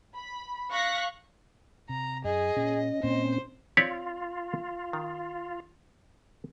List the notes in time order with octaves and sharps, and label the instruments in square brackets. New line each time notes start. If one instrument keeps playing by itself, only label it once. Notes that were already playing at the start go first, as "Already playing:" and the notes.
[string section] B5
F5 C#6 F#6 A#6 B6
[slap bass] C3 [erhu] A#5
[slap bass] F#2 [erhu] G#4 [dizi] D#5
[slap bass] A#2 [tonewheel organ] C#4
[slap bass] A#2 A#3 [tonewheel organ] C4 C#4 [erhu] C5
[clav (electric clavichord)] C4 C#5 D5 [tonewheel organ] F4 [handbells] B6
[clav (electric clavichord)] D#3